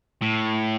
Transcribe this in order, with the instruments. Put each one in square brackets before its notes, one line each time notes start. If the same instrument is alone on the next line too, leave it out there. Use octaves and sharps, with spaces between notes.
[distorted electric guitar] A2